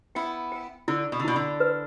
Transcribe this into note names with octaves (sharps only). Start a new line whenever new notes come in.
B3 E4 G5
G5
D3 E4
B2
D3
B2 E4
D3
B4